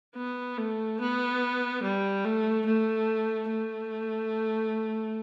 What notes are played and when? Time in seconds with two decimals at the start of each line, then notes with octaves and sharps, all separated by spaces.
0.16 B3
0.57 A3
1.00 B3
1.83 G3
2.24 A3
2.66 A3
3.49 A3